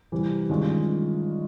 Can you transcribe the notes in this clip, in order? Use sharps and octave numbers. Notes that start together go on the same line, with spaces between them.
C3 E3 G3
G2 D#3 G#3 C#4 F4